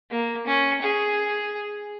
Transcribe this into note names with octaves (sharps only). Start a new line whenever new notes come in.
A#3
C#4
G#4